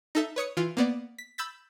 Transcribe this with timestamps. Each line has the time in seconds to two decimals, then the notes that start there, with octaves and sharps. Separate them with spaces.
0.15 D#4 A4 E5
0.36 B4 C#5 D#6 C#7
0.57 E3 F4
0.77 A#3 B3 D5
1.18 B6
1.38 B5 E6 G6 A6 B6